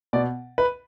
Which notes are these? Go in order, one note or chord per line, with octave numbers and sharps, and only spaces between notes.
B2 D5
B4